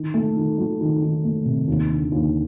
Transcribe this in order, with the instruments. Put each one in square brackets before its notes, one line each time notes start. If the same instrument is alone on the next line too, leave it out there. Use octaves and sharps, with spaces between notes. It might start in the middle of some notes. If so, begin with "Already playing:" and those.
Already playing: [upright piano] D#3
A3
D#3
F#3
D#3
D#3
A3
C3
D#2
D3
D#2